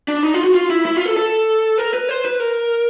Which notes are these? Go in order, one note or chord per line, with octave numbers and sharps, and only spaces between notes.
D4
D#4
F4
F#4
F4
E4
E4
F4
A4
A4
A#4
B4
C5
B4
A#4